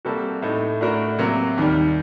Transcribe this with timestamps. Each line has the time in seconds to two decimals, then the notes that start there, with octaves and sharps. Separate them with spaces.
0.05 C3 G3 A#3 F#4 A4
0.42 A2 A3 D#4
0.81 A2 A3 D4 F#4 A#4
1.18 C3 F#3 A#3
1.58 D#2 D#3 G3